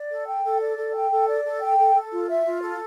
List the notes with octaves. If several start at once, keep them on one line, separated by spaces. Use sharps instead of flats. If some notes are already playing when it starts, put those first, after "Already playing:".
Already playing: D5
A4
G5
A4
D5
A4
G5
A4
D5
A4
G5
A4
A4
F4
E5
F4
A4